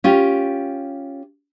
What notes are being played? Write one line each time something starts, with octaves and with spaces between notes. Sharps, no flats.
C#4 F4 G4